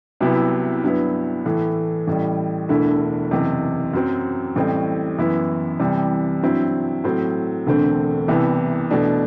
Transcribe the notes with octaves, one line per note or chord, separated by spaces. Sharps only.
C2 C3 F#3 B3 E4
G2 F#3 B3 E4
A2 E3 A3
A1 A2 G3
E1 D2 D3 A3 E4
F#1 E2 C3
F#2 F#3 C4
A1 A2 G3 C4
F#2 E3 B3 E4
C2 C3 E3 G3
G2 F#3 C4 E4
A2 F#3 C4
E1 D2 D3 A3 C4
C2 C3 E3 B3 E4
E2 B2 A3 D4